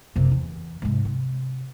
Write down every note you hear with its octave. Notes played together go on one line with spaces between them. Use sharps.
F#1 C3
E2
G#2 C3
C3